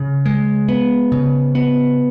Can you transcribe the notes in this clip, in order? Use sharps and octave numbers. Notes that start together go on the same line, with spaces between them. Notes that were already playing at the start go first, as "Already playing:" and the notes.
Already playing: C#3
G#3
B3
C#3
B3